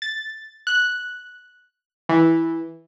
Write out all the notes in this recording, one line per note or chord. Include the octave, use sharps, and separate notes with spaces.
A6
F#6
E3